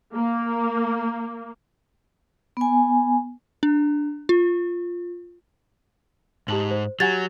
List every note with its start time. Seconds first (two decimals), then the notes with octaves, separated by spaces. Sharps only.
0.14 A#3
2.57 B3 G#5
3.63 D4
4.29 F4
6.48 G#2 G4 A5 F#7
6.71 C5
7.00 F#3 G4 F#5 G#5 G#6 A6